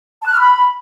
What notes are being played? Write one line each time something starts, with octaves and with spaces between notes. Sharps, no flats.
A5
F#6
F6
B5